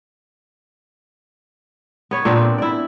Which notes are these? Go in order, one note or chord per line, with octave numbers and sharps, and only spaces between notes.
B3 C#5
A#2 B3 C4 D4
A4
E4 D5